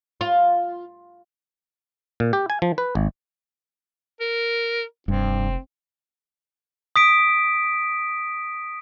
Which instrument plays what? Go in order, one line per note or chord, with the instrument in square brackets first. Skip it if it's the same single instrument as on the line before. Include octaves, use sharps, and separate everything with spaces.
[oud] F4
[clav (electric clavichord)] A#2
G4
G#5
F3
B4
G#1
[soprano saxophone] A#4
[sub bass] F1 [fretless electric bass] G2 [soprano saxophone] C4
[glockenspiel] D#6 B6 D7